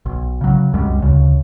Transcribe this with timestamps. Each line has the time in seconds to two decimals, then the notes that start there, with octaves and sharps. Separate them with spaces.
0.06 B1
0.41 C#3 F#3
0.73 C2 F#2 G3 G#3
0.99 D2 C#3